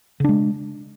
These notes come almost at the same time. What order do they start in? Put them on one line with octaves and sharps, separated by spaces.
C#3 D4 G#3